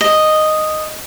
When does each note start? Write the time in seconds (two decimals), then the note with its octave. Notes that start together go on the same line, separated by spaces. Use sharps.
0.01 D#5